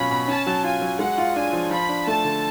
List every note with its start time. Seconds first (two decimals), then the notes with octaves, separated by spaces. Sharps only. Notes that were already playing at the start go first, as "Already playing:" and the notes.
Already playing: B2 F#3 C#4 F4 B5
0.11 B2
0.28 C#4 A5
0.47 F#3
0.64 F4 G#5
0.81 F#3
0.99 G#3 F#5
1.18 F4
1.36 D4 G#5
1.53 F3
1.71 F3 B5
1.89 D4
2.07 A3 A5
2.24 D3